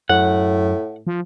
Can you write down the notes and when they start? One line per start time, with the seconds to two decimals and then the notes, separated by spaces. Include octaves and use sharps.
0.09 F#2 A2 F#5
1.07 F3